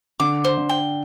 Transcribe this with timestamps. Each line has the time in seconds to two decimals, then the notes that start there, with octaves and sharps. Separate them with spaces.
0.20 D3 D6
0.45 C5
0.58 D3
0.69 G5